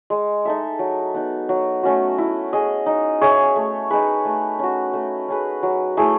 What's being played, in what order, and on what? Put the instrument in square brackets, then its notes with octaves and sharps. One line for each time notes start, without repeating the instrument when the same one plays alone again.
[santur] G#3
D#4 A4 E5
F#3
B3 D#4
F#3
A3 C#4 F#4
E4
G#4 D#5
D#4
G#4 C#5 E5
A3
D#4 G#4 B4
A3
C#4 F#4
A3
C#4 G#4 B4
F#3
A3 E4 G#4